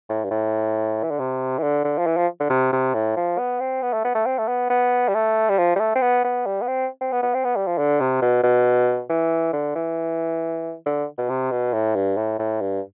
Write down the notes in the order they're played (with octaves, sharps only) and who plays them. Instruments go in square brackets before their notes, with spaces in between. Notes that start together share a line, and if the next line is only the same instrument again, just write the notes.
[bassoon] A2
G2
A2
E3
D3
C3
E3
D3
D3
F3
E3
F3
D3
C3
C3
A2
F3
B3
C4
B3
A3
B3
A3
C4
A3
B3
B3
G3
A3
G3
F3
G3
A3
C4
B3
B3
G3
B3
C4
C4
B3
B3
C4
B3
G3
F3
D3
C3
B2
B2
E3
D3
E3
D3
B2
C3
B2
A2
G2
A2
A2
G2